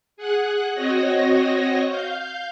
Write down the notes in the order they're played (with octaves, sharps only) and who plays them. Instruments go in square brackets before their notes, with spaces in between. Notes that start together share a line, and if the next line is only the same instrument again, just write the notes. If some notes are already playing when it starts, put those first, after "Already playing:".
[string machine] G#4 F#5 F#6
C4 F#4 C#5 D#5 A#6
F5 G6